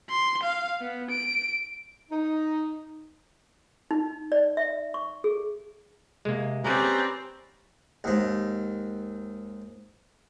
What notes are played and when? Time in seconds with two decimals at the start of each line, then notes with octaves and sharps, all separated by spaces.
0.10 C6
0.43 F5
0.81 B3
1.11 D7
2.11 D#4
3.91 D#4
4.32 D5
4.57 E5
4.94 C#6
5.24 G#4
6.25 C3 G#3 A#3
6.64 C4 C#4 G4 B4 D5 A#5
8.04 D#2 G#2